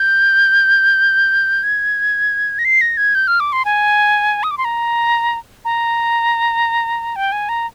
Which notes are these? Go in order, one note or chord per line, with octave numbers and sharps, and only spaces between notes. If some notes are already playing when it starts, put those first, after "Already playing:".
Already playing: G6
G#6
A#6
C7
A#6
G#6
G6
F6
D6
C6
G#5
D#6
D6
C6
A#5
A#5
G5
G#5
A#5